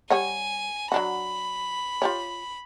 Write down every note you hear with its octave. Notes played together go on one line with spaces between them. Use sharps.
G3 C#5 F#5 G#5
F#3 D4 F#4 B5
F4 G4 C#5